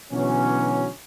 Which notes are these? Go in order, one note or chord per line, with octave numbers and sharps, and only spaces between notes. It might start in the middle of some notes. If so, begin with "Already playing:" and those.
B2 D3 E3 F#3 G#3 C#4